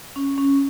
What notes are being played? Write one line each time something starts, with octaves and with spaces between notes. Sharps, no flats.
C#4
C#4